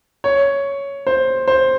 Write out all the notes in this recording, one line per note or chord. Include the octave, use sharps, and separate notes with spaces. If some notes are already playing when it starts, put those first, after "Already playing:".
C#5
C5
C5